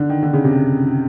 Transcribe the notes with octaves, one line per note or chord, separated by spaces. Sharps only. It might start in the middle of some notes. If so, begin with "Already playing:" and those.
Already playing: D3
D#3
D3
C#3
C3